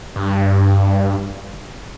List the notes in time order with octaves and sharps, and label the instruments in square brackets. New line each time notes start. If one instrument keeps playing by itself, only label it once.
[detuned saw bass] G2